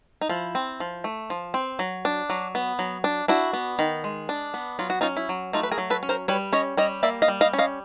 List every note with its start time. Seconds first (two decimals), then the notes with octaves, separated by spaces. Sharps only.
0.21 D#4
0.29 F3 E4
0.55 C4
0.80 F3
1.04 A3
1.30 F3
1.54 C4
1.79 F#3
2.05 D4
2.30 F#3
2.55 B3
2.79 F#3
3.04 D4
3.28 D4 E4 F#4
3.53 B3
3.79 D#3
4.04 G#3
4.29 D4
4.54 B3
4.79 F#3 F4
4.90 F#4
5.01 C#4 D#4 F4
5.17 E4
5.29 F#3
5.53 A3 D#4 F4
5.63 B4
5.72 G#4 A#4
5.78 F#3
5.90 A4 B4
6.03 C#4
6.09 A#4 C5
6.28 G3 B4 C#5
6.53 C#4 C#5 D#5
6.77 G3 C#5 D#5
7.03 A#3 D5 E5
7.22 D#5 F5
7.28 G3
7.41 D#5 F5
7.53 C#4
7.58 D#5 F5